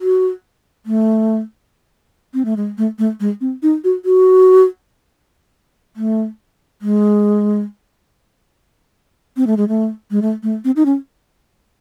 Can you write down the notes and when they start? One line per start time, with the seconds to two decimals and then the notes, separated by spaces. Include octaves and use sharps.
0.01 F#4
0.86 A3
2.34 C4
2.45 A3
2.57 G#3
2.78 A3
2.99 A3
3.20 G#3
3.41 C4
3.63 D#4
3.84 F#4
4.05 F#4
5.96 A3
6.82 G#3
9.37 C4
9.47 A3
9.57 G#3
9.68 A3
10.11 G#3
10.22 A3
10.43 A3
10.65 C4
10.76 D#4
10.86 C#4